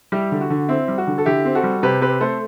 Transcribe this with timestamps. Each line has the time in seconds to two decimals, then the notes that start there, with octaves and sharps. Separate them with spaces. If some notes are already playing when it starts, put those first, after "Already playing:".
0.12 G3 E4 G4
0.32 D3
0.41 F#4
0.50 D3
0.69 C4 E4
0.88 G3
0.98 F#4
1.07 D3
1.18 A4
1.26 D3 E4 G4
1.45 C4
1.55 F#4 A4
1.63 G3
1.83 C3 G4 B4
2.01 C4 G4 B4
2.20 A3 A4 C5